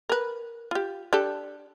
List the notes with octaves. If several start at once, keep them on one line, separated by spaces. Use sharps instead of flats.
A#4 B4
F4 G4
D4 G4 A4